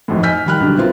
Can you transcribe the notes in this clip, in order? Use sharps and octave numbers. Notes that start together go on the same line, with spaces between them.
G#1 F2 A2
D#5 G#5 F6 G6 B6
D#3 G3 B5 F6 F#6
B1 D3 G3
B3 C4 E4 F4 A#4